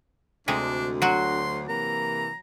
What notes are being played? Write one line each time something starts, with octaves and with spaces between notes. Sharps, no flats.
D2 C3 G#3 D4
F#3 F#4 C6
C3 E3 A#3 A#5